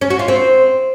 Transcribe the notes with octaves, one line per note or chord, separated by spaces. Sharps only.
C#4
F#4
F4
C4